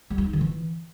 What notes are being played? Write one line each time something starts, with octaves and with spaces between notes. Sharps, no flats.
G3
E4
D#4
D#3
E3